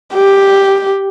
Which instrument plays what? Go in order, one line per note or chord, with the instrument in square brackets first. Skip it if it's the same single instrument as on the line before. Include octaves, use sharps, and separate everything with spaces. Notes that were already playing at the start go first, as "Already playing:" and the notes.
[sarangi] G4